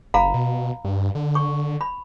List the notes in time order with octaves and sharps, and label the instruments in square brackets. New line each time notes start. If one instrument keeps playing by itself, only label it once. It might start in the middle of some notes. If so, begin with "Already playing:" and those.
[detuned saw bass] F#1 [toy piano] F5 A#5 B5
[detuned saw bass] B2
G2
D3
[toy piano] C#6
B5